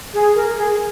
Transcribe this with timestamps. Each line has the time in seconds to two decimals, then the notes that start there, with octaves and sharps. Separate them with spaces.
0.13 G#4
0.35 A#4
0.57 G#4